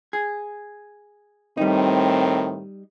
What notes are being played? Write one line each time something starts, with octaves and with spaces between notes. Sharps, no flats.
G#4
A2 D#3 G3 C4 D#4